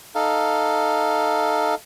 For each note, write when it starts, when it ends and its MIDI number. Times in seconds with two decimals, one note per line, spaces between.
0.15 1.75 63
0.15 1.75 69
0.15 1.75 77